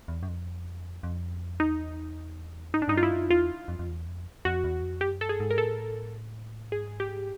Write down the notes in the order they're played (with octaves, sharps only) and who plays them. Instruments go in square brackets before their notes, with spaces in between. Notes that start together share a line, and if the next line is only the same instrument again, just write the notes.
[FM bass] E2
F#2
F2
F2
[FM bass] E2 [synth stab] D#4
[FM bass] G#2 [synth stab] D#4
[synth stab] D4
[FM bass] G#2 [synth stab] D#4
[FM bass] G2 [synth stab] F4
[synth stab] E4
[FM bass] F#2
[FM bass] E2 [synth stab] F4
[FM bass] F2
F2
E2
F2
[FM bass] F2 [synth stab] F#4
[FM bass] E2
F2
[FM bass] F#2 [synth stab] G4
[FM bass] G2 [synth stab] A4
[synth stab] G#4
[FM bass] G#2
[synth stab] A#4
[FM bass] A2 [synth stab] A4
[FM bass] G#2 [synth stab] G#4
[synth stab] G4